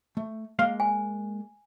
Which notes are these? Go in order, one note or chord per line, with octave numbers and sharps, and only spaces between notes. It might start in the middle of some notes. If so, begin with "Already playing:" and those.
A3
G#3 A#3 F5 C6
G#5